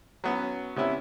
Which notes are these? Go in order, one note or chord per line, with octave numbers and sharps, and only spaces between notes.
F#3 B3 C#4
C3 B3 C#4 E4